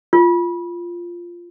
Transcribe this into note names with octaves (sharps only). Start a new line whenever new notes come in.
F4